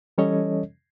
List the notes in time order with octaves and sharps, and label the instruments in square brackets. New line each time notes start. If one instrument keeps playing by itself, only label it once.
[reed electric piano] E3 G3 C#4 A4 C#5 D#5